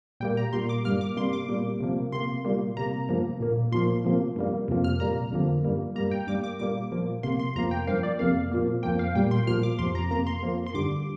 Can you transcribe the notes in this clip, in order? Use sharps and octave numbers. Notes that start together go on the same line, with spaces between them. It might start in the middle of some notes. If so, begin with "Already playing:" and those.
A#2 G3 A#3 G5
A#5
A#2 G3 A#3 C6
D6
G2 G3 A#3 F6
D6
C3 G3 A#3 C6
D6
A#2 G3 A#3
C3 F3 A#3
C3 A#3 C6
A#2 G3 A#3
C3 A#3 A#5
G2 F3 A#3
A#2 A#3
A#2 F3 A#3 C6
C3 F3 A#3
G2 G3 A#3
F2 C3 F3 A#3
F6
A#2 G3 A#3 A#5
F2 D3 F3 A#3
G2 G3 A#3
G2 G3 A#3 A#5
G5
G2 G3 A#3 D6
D6
A#2 G3 A#3 D6
A#2 F3 A#3
C3 A#3 C6
C6
F2 F3 A#3 A#5
G5
G2 F3 A#3 F5
D5
F2 C3 A#3 F5
A#2 F3 A#3
F2 F3 A#3 G5
F5
A#2 G3 A#3 G5
C6
A#2 F3 A#3 F6
D6
F2 C3 F3 C6
A#5
F2 C3 A#3 A#5
C6
F2 F3 A#3
C6
G2 D3 G3 D6